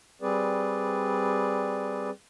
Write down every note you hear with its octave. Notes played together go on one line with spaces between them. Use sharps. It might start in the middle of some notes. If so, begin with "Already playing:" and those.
G3 C4 G#4 B4 D5